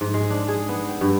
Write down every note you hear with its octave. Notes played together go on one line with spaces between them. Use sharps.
G#2
G#3
D4
G#4
B3
G5
G2